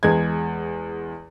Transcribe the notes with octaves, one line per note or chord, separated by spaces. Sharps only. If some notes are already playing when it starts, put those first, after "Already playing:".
E2 G#3 G#6